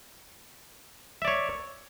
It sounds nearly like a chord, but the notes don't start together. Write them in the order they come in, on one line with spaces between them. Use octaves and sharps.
E5 D5 C#5